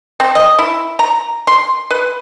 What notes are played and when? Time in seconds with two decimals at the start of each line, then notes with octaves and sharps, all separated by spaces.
0.20 C4
0.35 D#5
0.58 E4
0.99 A#5
1.47 C6
1.90 B4